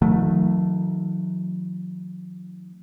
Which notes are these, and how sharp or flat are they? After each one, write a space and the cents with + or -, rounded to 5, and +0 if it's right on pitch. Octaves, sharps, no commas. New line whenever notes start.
D#3 +25 F#3 -40 A3 +0